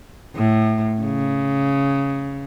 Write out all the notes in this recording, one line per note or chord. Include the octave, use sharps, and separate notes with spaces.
A2
C#3